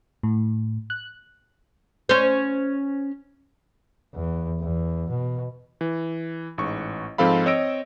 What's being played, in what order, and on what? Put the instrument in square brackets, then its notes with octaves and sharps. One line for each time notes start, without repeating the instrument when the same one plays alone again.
[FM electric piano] A2
F#6
[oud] C#4 C5
[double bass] E2
E2
B2
[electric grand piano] E3
A1 G#2 C#6
G#2 F3 C4 A4 F5 B5
C4 C#5 D#5 E6 A#6 D7